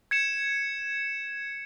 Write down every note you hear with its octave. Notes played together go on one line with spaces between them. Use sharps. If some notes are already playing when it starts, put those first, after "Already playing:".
G#6 C#7 E7